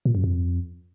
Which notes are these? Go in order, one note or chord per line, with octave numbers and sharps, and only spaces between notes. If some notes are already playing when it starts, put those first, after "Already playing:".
A#2
F#2
F2